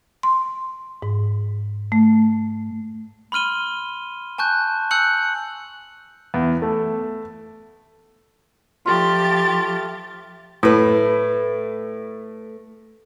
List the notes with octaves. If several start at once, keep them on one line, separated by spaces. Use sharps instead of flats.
C6
G#2
A3
B5 C6 F6 D#7 G7
G#5 A5 C#6 F#6 G6
G#5 E6 F#6 G6 C#7 F#7
E2
A3
F3 A3 F4 G4 A6
A2 A3 B4